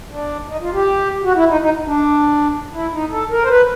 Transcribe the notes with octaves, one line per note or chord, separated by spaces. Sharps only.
D4
D#4
F4
G4
F#4
E4
D#4
D#4
D4
E4
D#4
A4
A#4
C5
B4